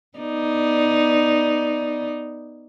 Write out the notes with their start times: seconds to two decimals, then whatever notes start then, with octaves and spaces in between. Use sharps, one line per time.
0.18 B3 D#4 D5